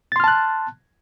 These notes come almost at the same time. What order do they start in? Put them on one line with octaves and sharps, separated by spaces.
A6 C6 F6 A5 F#6